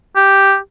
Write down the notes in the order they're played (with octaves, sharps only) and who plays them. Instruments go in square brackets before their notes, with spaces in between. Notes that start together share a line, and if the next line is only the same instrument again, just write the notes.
[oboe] G4